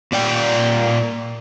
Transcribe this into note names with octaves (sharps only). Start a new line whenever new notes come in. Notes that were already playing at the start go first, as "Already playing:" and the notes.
A#2 D5 G5